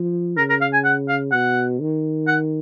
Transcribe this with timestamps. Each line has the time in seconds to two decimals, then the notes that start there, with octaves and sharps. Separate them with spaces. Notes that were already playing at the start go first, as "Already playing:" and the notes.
Already playing: F3
0.37 C#3 A#4
0.50 A#4
0.61 F5
0.73 G#5
0.85 F#5
1.09 F5
1.32 B2 F#5
1.80 D#3
2.27 F#5